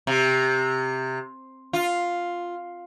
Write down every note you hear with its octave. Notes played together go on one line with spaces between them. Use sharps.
C3
F4